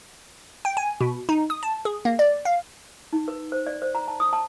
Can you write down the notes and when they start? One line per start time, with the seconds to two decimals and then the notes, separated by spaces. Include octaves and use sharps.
0.65 G5
0.77 G#5
1.01 B2
1.29 D#4
1.50 D#6
1.63 A5
1.85 G#4
2.05 A#3
2.19 D5
2.45 F5
3.13 D#4
3.28 B4
3.52 C5
3.67 D5
3.82 C5
3.95 A#5
4.08 A5
4.20 D#6
4.33 A5